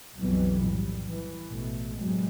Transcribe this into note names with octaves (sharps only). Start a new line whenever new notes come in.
B1 F2 B2 E3 F#3 G3
A2 G3
E3
A1 B2 A3
E2 A2 C3 F#3 G#3